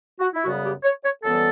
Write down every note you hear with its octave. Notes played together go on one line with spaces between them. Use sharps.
F#4
E4
F#2 C#3 G3 B3 F#4
G4
C#5
C#5
F#2 E3 G3 B3 A4